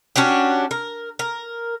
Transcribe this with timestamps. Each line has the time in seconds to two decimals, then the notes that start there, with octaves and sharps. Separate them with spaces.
0.16 C#4 D4 F#4 G4
0.71 A#4
1.19 A#4